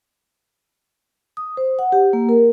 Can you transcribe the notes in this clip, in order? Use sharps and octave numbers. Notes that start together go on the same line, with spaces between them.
D#6
C5
F#5
G4
A#3
A#4